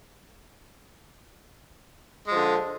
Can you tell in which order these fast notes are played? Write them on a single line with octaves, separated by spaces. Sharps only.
G#3 F3 D3